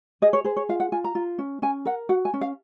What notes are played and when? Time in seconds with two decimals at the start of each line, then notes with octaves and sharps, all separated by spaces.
0.22 G#4 D#5
0.33 C#5
0.44 G#4 C5
0.57 C#5
0.69 F4 F5
0.80 F#5
0.92 F4 G#5
1.04 A#5
1.15 F4
1.38 C#4
1.62 C#4 G#5
1.85 A#4 F#5
2.09 F#4 F#5
2.25 G#5
2.34 C#4
2.41 F5